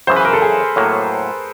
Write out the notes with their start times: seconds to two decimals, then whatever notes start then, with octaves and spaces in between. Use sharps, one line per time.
0.07 F#2 C#3 E3 C5
0.16 B4
0.25 A#4
0.33 A4
0.42 G#4
0.76 A2 F#3 A#3